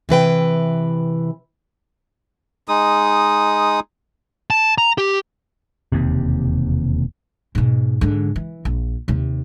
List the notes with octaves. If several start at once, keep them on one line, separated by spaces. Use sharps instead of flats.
C3 E3 B4 G5
G#3 D#4 D#6
A5
A#5
G4
E1 D#2 C3
G#2 B2
G#2 D3
E3
A#1
D#2 C3